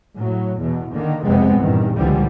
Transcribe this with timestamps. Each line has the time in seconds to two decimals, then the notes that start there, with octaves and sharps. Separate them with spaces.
0.15 A2 F#3
0.58 E2 B2
0.92 D3 D#3 A#3
1.24 F#1 F2 C3 G#3 B3 C4
1.57 E2 G2 A#2 D#3
1.95 C#2 A#2 D3 E3 F3 G3